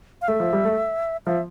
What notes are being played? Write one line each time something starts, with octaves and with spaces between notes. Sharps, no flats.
F5
A3 E5
F3
G3
A3
F3 E5